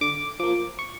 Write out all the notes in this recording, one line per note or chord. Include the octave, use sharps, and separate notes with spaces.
D3 D6
F3 A#3 D6
C#6